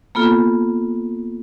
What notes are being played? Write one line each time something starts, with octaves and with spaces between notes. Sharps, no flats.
A#3 B3 F4 A4